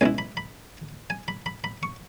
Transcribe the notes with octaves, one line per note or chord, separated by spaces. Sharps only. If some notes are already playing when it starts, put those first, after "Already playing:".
C#2 B2 B3 E4 G#5
B5
B5
G#5
B5
B5
B5
C#6